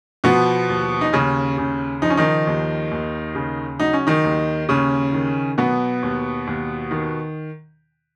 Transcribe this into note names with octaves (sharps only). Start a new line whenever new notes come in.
B2 F3 B3
D#2
D#4
D#2 C#3 C#4
C#3
F3 D#4
C#4
D#3 D#4
D#2
D#2
C#3
F#3 D#4
C#4
D#3 D#4
D#2
D#2 C#3 C#4
D#3
B2 F#3 B3
D#2
D#2
D#3